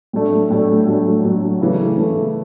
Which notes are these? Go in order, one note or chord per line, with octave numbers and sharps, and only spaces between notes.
A2 F#3 A3 D4
A2 F#3 A3 D4
A2 F#3 A3 D4
A2 F#3 A3 D4
C#3 E3 A3
C#3 E3 A3